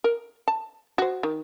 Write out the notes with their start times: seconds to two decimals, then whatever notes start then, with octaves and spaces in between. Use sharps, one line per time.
0.04 A#4
0.48 A5
0.98 F#4 C5
1.23 D#3